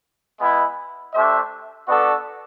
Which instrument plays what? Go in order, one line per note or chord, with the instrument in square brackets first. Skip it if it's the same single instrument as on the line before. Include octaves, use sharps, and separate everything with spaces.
[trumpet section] G#3 B3 E4
A3 D4 G4 C5 E5
B3 D4 F#4 A4 D5